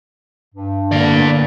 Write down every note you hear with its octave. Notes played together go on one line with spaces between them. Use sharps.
G2
D3 A#3 B3 D4 D5 F5